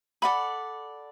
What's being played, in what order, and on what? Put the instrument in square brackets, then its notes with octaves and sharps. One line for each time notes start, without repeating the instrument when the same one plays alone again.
[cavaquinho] A4 D5 F#5 B5